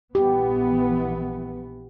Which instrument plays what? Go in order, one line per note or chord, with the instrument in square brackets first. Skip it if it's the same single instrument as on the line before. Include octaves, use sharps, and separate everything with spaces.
[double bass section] A#1 E3 B3 [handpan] G4